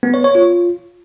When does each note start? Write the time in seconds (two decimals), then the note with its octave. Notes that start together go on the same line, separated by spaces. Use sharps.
0.03 B3
0.14 C#5
0.24 C#5
0.35 F4